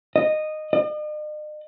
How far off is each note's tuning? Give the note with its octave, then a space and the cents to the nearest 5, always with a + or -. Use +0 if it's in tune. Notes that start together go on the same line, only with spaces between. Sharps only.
D#5 -15
D#5 -45